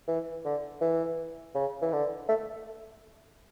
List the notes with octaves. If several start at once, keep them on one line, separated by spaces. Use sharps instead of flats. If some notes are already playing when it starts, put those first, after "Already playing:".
E3
D3
E3
C#3
E3
D3
A3